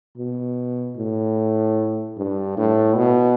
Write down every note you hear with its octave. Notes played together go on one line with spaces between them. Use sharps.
B2
A2
G2
A2
B2